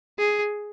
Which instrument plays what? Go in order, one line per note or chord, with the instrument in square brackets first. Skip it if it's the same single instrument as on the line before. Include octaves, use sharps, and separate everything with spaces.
[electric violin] G#4